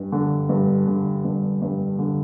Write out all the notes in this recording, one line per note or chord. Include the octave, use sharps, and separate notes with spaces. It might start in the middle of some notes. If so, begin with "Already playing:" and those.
Already playing: G2
D3
G2
D3
G2
G2
D3